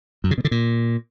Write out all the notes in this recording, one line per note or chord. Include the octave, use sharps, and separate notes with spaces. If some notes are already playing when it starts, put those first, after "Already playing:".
F#2
C#3
B2
D3
A#2